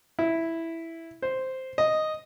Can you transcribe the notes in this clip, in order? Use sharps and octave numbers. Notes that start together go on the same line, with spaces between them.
E4
C5
D#5